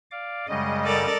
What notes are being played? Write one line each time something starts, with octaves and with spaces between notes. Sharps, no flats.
D5 F5 D6
F#2 C#3 G3 G#3 D#5
A4 A#4 D5